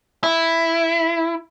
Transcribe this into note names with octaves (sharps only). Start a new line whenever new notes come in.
E4